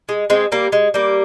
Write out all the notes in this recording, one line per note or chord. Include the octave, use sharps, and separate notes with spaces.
G#3
G#3 C4
G3 A#3
G#3
G3 A#3